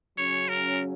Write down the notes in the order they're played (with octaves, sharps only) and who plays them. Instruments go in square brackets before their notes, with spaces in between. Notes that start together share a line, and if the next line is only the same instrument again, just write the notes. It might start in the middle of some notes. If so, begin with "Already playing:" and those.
[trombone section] C#3 F#3 C#4 [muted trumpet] C#5
[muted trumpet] A#4